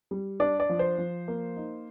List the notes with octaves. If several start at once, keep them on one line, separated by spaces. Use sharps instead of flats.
G3
D4 D5
D5
F3
C5
F3
A#3
D#4